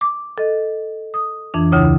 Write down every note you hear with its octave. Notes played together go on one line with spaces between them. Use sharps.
D6
A4 D#5
D#6
F2 E3 D4
D2 C#3 E4 C#5 D#6